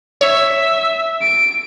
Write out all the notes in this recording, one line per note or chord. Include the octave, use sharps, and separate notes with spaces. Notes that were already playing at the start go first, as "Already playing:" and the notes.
C#5 E5
D7